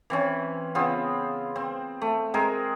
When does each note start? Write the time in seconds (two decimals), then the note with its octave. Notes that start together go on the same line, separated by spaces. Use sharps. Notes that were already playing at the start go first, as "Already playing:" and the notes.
0.10 E3 C4 C#4
0.75 C#3 B3 C4 F4
1.56 C4
2.02 A3
2.34 G#3 C4 G#4 A#4